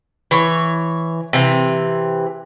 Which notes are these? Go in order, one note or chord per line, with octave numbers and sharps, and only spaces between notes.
E3 C#5
C3 E3